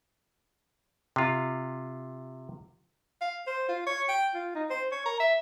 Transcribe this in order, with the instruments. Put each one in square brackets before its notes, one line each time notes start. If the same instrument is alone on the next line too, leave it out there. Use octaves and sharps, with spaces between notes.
[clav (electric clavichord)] C3 F4
[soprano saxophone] F5
C5
F4
C#5
G5
F4
D#4
C5
C#5
A#4
E5